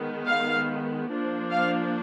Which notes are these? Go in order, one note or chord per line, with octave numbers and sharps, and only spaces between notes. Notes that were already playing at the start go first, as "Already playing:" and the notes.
Already playing: D#3 G#3 B3
F5
F3 A#3 D4
F5